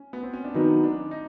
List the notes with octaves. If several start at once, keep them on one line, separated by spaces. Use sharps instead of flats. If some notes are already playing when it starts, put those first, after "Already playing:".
Already playing: C#4
B3
C4
C#4
D4
D#3 F#3 B3 D#4
D4
D#4